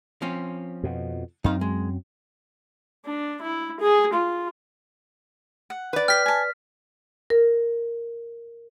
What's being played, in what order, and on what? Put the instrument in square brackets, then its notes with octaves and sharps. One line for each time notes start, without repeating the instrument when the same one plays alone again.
[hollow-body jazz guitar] F3 C4 C#4
[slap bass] F2 B2
[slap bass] F#2 F#3 C4 [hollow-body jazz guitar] D#4 F5
[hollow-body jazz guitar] G#3
[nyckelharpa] D4
E4
G#4
F4
[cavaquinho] F#5
[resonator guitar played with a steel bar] B4 D5
[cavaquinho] G5 [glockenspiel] F6 B6
[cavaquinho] G#5 A5
[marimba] A#4